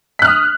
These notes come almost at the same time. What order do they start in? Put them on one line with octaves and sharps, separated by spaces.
B6 F#6 F6 D#6